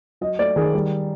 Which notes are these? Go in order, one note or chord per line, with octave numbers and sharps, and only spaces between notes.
F#3 D#5
A3 D5
D#3 G#4
G3